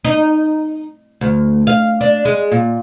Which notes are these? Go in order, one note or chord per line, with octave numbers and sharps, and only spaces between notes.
D#4
D2
F5
D4
G#3
A#2